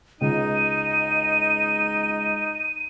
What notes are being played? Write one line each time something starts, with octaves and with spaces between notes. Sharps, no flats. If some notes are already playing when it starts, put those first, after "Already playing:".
C#2 D#4 D#7